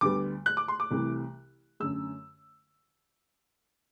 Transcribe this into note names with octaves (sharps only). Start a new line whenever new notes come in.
D2 D3 G3 B3 D6
F#6
D6
C6
D6
C2 C3 E3 A3
F#2 D3 A3 E6